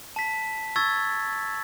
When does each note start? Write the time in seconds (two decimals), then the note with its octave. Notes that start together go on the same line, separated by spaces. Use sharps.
0.16 A5 B6
0.76 C#6 E6 G#6 A6